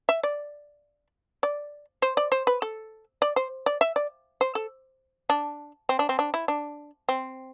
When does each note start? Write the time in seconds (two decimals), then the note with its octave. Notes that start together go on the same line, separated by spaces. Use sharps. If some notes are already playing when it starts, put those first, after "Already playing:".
0.09 E5
0.23 D5
1.43 D5
2.02 C5
2.17 D5
2.32 C5
2.47 B4
2.62 A4
3.22 D5
3.36 C5
3.66 D5
3.81 E5
3.96 D5
4.41 C5
4.55 A4
5.30 D4
5.89 C4
5.99 D4
6.09 C4
6.19 D4
6.34 E4
6.48 D4
7.09 C4